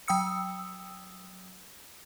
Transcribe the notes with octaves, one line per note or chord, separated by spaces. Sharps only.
F#3 G5 D#6 E6 C#7